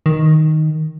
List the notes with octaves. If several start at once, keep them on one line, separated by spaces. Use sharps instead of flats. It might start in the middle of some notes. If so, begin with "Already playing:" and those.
D#3